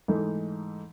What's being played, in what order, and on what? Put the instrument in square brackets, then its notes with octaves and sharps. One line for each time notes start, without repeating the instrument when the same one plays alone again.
[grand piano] G#2 E3 A3 D#4